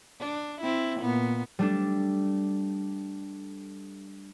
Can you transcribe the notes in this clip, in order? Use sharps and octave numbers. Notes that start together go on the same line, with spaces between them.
D4
C4 E4
A#2 B3
G3 A3 D4